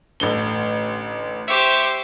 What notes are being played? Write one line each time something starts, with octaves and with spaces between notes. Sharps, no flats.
A1 D3 G7
G4 C5 E5 C#6 D6